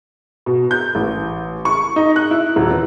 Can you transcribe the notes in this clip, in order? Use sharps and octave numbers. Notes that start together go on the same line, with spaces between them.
B2
G6
A1
C#6
D#4
F#6
E4
D#1
E3